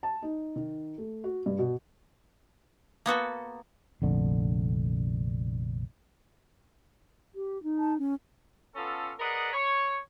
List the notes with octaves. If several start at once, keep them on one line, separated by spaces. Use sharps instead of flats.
A5
D#4
D#3
A3
F#4
G2
B2
A#3 B3 F#4 A4
F1 A#1 D3
G4
D#4
A5
C#4
B3 C#4 F4 A4
G#4 A#4 B4 D5 D#5 F#5
C#5